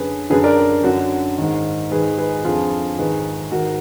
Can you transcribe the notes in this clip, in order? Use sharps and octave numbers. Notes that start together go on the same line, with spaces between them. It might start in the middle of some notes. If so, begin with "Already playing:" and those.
Already playing: F#2 D3 G#4 B4
F#2 D3 G#4 B4
A#4 D5
F#2 D3 F#4
G#2 D#3
G#2 D#3 G#4 B4
G#4 B4
F2 D3 F4 G#4
G#2 D#3 G#4 B4
G#2 D#3 F#4 A#4